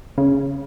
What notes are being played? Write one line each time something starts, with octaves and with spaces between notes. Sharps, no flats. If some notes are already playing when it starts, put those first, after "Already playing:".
C#3